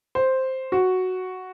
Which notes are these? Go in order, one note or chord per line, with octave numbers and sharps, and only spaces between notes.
C5
F#4